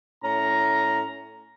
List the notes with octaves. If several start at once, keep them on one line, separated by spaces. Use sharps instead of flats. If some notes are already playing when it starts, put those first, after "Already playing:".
A2 C#4 A#5